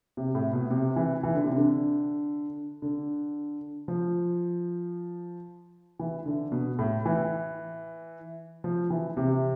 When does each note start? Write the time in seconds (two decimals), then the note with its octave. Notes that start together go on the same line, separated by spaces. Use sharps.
0.17 C3
0.35 A2
0.53 B2
0.71 C3
0.96 E3
1.23 E3
1.35 D3
1.45 C3
1.57 D3
2.82 D3
3.88 F3
5.99 E3
6.26 D3
6.52 B2
6.79 A2
7.05 E3
8.64 F3
8.90 E3
9.17 C3